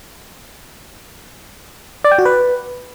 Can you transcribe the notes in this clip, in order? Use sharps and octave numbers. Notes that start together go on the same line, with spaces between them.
D5
G5
F#4
B4